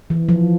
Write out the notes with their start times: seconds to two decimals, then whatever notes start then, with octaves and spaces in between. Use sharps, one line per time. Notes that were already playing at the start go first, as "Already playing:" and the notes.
0.10 E3
0.29 F3